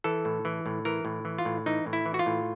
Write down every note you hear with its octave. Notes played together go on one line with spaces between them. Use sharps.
E3 A4
A2
E3
A2
E3 A#4
A2
E3
F4
A2
E3 D#4
A2
E4
E3
F#4
F4
A2